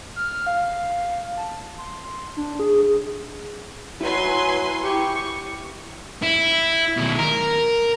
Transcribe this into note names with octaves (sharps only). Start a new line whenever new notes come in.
F6
F5
A5
C6
D4
G#4
F#3 E4 B4 G#5 C6
G4 C#6
E4
B2 D#3
A#4